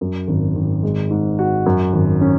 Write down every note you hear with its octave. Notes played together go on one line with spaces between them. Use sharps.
F#2
G#1
G#1
G#3
G#2
F#4
F#2
G#1
C#4